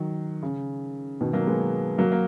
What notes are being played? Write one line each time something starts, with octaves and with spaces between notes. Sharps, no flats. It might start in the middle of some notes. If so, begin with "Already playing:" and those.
Already playing: D#3 F#3
C#3
B2 D#3
F#3 A#3
G#3 B3
F#3 A#3
A#3